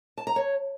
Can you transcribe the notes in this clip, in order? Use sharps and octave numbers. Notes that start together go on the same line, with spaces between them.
A5
A#5
C#5